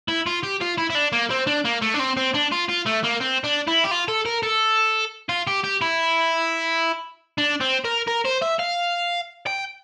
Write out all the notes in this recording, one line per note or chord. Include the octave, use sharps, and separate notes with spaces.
E4
F4
G4
F4
E4
E4
D4
A#3
C4
D4
A#3
A3
D4
C4
C4
D4
F4
F4
A3
A#3
C4
D4
E4
G4
F4
A4
A#4
A4
F4
G4
G4
E4
D4
C4
A#4
A#4
C5
E5
F5
G5